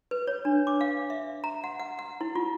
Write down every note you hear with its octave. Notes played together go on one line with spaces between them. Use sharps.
B4
C#5
D4
D6
F5
E5
A#5
F#5
F#5
F#5
E4
F4